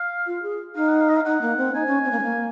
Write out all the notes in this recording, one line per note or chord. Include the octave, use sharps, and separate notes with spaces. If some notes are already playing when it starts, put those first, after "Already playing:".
Already playing: F5
F4
G#4
D#4 F5
F#5
F5
D#5
F5
D#4 F#5
A#3
C4
D#4 G#5
C#4
C4
A#3
G#3
A#3